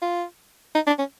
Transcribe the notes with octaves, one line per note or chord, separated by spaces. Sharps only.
F4
D#4
D4
C#4